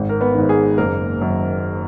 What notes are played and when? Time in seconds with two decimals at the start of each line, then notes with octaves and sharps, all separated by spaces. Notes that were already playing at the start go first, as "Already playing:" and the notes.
Already playing: G#1
0.09 A#4
0.21 B3 B4
0.34 G#2 D#3
0.49 G#4
0.78 F#1 A#3 A#4
1.21 F#2 D#3